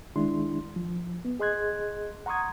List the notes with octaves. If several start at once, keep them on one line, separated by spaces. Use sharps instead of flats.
D#3 G#3 D4 E4 C6
F3
B3
G#4 D#5 C6 F#6 G#6
F#5 A#5 C6 C#6 D#6 G#6